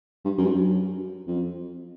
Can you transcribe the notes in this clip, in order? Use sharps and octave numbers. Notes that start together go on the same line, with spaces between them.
G2
F#2
G2
F#2
F2